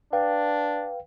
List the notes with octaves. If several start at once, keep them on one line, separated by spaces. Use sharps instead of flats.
D4 B4 F5 G5